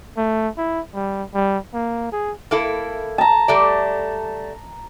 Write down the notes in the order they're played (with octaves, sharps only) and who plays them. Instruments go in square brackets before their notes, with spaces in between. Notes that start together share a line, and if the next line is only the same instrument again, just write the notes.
[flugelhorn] A3
E4
G3
G3
A#3
G#4
[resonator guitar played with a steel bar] A#3 E4 A4
[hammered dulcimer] A5 A#5
[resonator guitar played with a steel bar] G3 A3 D5